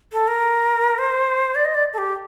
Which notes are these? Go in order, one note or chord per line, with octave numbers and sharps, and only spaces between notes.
A4
A#4
C5
D5
D#5
D5
A4
G4